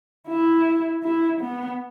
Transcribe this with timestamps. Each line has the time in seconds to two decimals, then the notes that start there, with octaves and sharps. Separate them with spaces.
0.29 E4
1.04 E4
1.41 B3